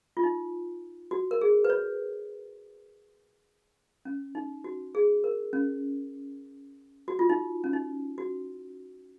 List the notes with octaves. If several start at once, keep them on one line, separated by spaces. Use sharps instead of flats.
F4
D#4
F#4
A#4
G#4
B4
C#5
C#4
D#4
F#4
G#4
A#4
C#4
F#4
F4
D#4
C#4
D#4
F#4